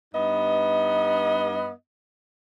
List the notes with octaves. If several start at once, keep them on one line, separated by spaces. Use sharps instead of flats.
G2 B3 D#4 D#5